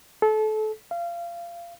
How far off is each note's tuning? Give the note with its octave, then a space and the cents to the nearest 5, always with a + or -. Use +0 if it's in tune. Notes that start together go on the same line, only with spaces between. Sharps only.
A4 -30
F5 -25